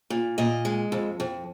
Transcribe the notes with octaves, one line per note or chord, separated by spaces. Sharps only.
A#2
A#2 D#5
G#3
F2
F2